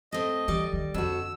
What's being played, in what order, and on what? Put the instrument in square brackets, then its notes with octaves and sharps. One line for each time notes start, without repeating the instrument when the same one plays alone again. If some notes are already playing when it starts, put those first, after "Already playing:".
[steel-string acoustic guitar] A3 C4 [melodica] D#5
[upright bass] E3 [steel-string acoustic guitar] G3 D5
[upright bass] D#3
[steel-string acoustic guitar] F2 F#4 [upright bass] D3 [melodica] E6